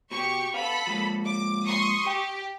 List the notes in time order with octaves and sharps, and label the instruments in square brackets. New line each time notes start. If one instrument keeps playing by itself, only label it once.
[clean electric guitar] B2 [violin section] G4 C#6
[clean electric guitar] B3 F5 [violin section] A4 B5
[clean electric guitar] F3 G#3 A#3
[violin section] D6
C6 C#6 D#6
[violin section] G4 [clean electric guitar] G5